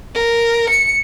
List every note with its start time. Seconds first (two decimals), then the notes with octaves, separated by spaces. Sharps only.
0.15 A#4
0.70 C#7